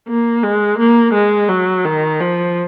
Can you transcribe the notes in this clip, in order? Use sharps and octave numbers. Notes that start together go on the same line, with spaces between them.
A#3
G#3
A#3
G#3
F#3
D#3
F3